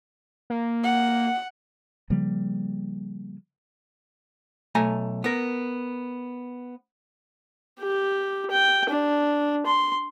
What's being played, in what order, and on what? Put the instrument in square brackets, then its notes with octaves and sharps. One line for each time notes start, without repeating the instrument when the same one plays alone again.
[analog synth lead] A#3
[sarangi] F#5
[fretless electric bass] C#3 F3 G3 A#3
[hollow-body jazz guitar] B1 A3 G#5 A#5
B3 A#4
[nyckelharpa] G4
G5
D4
C6